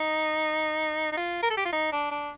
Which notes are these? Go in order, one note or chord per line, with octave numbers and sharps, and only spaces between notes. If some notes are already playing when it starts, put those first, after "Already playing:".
Already playing: D#4
D#4
F4
A#4
A4
G4
F4
D#4
D4
D4